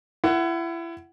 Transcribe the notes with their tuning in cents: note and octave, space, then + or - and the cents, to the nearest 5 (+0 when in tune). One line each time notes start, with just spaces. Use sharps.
E4 +30 F#5 +15